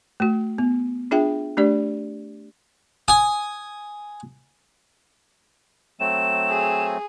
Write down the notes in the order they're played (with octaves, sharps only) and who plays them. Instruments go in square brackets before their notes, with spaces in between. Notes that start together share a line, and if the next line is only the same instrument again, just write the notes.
[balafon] A3 F#4
B3
D4 F4 G#4 E5 G5
A3 D4 G4 D5
[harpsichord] G#5 D#6
[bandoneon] F#3 A3 C4 [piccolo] E7
[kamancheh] G#4